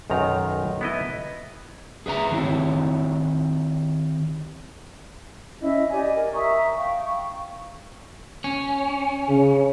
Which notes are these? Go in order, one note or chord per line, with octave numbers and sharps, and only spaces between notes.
B1 F#2 D#3 A#5
B3 E4 D#5
G#4 B4 E5 A#5
D#3 C4 E4 G4 C#5
C#4 E4 D#5
G4 D5 D#5 G#5
A#4
E5 A#5 C#6 D#6
F5 G5 C#6
C#4
C#3